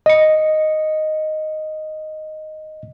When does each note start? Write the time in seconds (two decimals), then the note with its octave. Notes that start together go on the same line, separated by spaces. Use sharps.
0.06 D#5 C#7